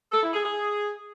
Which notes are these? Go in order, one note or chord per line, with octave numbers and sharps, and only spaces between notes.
A4
E4
G#4
G#4